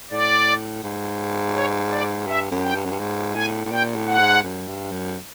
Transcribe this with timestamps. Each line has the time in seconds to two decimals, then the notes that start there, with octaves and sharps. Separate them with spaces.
0.11 A2 D5
0.83 G#2
1.55 C#5
1.92 D5
2.27 G2 E5
2.51 F#2
2.63 G5
2.75 G2
2.85 F#2
2.92 G2
3.00 G#2
3.35 A2 G#5
3.65 A2
3.72 A#2 G5
3.95 A2
4.07 F#5
4.19 G#2
4.43 F#2
4.67 G2
4.91 F#2